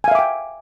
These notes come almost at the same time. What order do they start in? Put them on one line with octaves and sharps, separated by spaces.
G#5 F5 E5 D6 G5